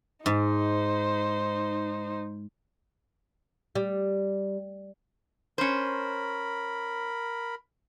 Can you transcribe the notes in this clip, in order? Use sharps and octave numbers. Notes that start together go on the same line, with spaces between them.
G#2 D#4 C5
G3
C#4 A#4 C5 B5